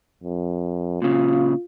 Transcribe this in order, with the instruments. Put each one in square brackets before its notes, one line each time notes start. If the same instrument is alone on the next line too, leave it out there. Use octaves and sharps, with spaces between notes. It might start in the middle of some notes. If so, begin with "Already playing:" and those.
[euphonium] F2
[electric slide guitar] A#2 C#3 [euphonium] F4